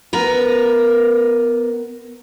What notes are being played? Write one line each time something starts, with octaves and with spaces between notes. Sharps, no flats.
B3 A#4 B4